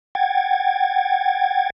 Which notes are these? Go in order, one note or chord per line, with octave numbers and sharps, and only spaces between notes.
F#5 G5 G#6 A6